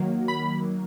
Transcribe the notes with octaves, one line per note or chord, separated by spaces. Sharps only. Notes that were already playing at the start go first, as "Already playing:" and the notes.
Already playing: D#3 F#3 A#3
B5